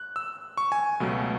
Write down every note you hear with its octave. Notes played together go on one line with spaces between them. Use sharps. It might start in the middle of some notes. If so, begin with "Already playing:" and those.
Already playing: F#6
E6
C#6
G#5
C#2 B2 F#3 A3